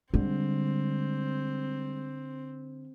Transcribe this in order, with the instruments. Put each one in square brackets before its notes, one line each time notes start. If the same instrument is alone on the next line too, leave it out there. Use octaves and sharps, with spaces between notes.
[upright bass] D3 [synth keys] G3 G#3 [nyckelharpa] C4